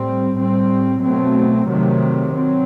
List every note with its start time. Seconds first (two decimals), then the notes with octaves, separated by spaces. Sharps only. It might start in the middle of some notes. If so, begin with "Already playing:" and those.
Already playing: A2 G3 C4
0.36 A2 G3 C4
1.02 B2 F#3 A3 C4
1.67 C3 D#3 F#3 A3
2.34 F#3 C4